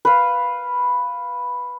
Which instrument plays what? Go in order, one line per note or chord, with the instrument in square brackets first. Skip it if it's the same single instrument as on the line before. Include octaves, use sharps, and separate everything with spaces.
[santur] B4 F5